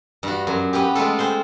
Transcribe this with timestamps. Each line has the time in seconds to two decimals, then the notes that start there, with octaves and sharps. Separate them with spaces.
0.23 G2 F#4
0.47 F#2
0.73 B3 C#4 G4
0.95 G#3 A3 F4 A4
1.19 C4 C5 C6